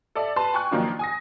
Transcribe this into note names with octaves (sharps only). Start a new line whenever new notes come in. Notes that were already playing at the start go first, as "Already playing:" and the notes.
A4 D5 E5
B4 A5 C6
G5 G#5 C#6 F#6
D#3 F3 F#3 A#3 D4 F4
G#5 D#6 A#6